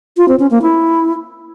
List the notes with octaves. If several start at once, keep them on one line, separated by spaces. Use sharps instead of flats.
F4
C4
C#4
A#3
E4